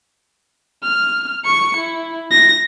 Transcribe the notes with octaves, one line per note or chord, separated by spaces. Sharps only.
F6
C#6 C#7
E4
A#6